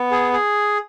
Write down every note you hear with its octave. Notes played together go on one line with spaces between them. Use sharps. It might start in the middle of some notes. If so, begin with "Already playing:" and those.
Already playing: B3
G#4
G#4